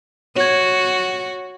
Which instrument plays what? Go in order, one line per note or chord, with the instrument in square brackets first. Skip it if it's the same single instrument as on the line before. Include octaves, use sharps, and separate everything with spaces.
[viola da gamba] F#4 [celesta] C#5 G#6